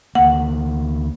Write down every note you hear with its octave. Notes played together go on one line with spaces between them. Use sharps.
D2 A#3 F#5